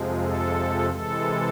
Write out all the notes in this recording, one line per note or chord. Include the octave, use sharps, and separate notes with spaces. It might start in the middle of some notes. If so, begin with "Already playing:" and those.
Already playing: F2 C3 F3 G#3
A4
C3 E3 G#3 A4